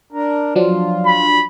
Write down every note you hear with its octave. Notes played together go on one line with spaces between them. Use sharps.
D4 A#4
F3 F#3 D4 F4
B5